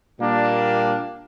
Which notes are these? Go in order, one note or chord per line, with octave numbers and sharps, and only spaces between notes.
A#2 G3 A#3 D4